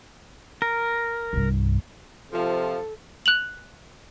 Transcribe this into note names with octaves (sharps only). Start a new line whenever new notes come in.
A#4
C2 G2
C3 F3 A4
F#6 F7 F#7